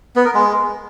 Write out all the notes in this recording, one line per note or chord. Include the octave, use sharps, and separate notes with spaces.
B3
A#4
G#3